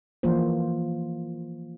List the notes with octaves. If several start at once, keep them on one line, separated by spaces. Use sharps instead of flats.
E3 F3 A#3 F4 C5